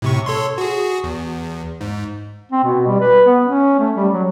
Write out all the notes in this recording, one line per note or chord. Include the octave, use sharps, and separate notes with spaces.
A2 C3 C#6
A4 C#5 C6
F#4 G#4
E2
G#2
C4
B2
G3
B4
B3
C#4
A3
G3
F#3